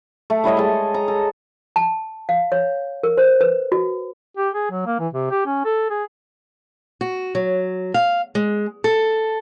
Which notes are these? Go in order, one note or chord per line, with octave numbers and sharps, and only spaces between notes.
A3
G3 E4 C#5 D#5
G#3 A5
A#5
A4
A5
F5
C#5
A#4
C5
B4
F#4
G4
G#4
F#3
A#3
E3
C3
G4
C#4
A4
G#4
F#4
F#3
F5
G#3
A4